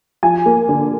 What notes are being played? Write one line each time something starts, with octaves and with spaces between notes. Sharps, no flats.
F3 G#5
A#3
D3